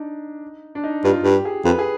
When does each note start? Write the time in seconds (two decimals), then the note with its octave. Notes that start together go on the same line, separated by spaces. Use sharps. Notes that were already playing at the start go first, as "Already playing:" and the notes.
Already playing: D4 D#4
0.75 D4
0.84 D#4
1.04 G2 F4
1.24 G2 G4
1.45 G#4
1.65 F2 B4
1.79 G#4